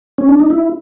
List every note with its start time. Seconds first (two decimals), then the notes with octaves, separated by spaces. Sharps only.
0.18 C#4
0.29 D4
0.40 D#4
0.50 E4